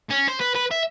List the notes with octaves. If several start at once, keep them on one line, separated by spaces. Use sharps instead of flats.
C#4
C5
B4
B4
E5